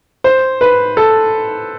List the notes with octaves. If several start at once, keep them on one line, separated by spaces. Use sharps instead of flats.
C5
B4
A4